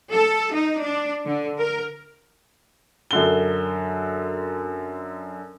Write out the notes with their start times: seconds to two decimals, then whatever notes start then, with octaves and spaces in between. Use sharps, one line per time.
0.13 A4
0.54 D#4
0.83 D4
1.26 D3
1.58 A#4
3.11 F#2 D3 G7